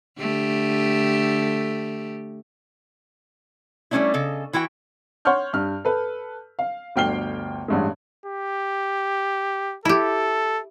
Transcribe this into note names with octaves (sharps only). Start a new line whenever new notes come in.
D3 A3 G4
G3 A3 A#3 C#4 D4 E4
C#3 A4 D#5
E3 E4 F#4 G5
C#5 F#5 C6 C#6 F6 G6
G2 F6
A4 B4
F5
G1 D2 G5 F6 C7 G7
A1 G2 G#3
G4
E4 G4 A4